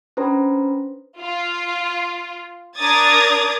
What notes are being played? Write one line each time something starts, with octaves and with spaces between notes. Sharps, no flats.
C#4 D4 B4 C5 A#5
F4
D4 A#4 D5 D#6 G#6 A6